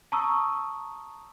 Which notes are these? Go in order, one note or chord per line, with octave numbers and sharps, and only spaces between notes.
A5 A#5 C#6 D#6 E6